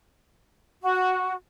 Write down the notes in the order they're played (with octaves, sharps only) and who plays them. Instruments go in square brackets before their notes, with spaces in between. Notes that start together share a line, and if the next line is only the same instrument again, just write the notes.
[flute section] F#4